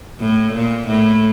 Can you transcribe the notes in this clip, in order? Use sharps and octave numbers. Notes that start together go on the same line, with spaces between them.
A2
A#2
A2